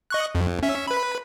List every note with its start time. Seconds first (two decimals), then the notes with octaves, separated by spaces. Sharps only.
0.10 D#5 C#6 F#6
0.35 F2
0.63 C#4 E5
0.87 B4 B5